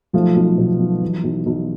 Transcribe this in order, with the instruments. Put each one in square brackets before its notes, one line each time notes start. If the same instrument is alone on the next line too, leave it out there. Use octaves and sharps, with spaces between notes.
[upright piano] B1 F3 A3
B1
B2
B1
E3
B1
B1